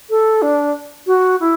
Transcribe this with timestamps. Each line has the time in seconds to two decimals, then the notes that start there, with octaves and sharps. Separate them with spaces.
0.10 A4
0.42 D4
1.06 F#4
1.40 E4